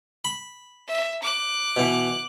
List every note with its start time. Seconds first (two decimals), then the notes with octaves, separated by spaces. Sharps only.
0.25 B5
0.87 E5
1.22 D6 F#6
1.77 B2 E3